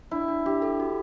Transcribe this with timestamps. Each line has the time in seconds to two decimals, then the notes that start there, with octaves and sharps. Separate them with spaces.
0.11 D4 E4
0.28 D4
0.46 D4 G4
0.62 A4
0.80 F#4